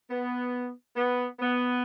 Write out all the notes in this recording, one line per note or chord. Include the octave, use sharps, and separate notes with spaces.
B3
B3
B3